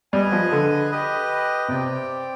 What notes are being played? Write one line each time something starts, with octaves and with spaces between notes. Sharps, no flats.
G3 G#4 B4 D#5 G#5
F3
D3
G4 B4 D#5
C3 C4 G4 D5 G5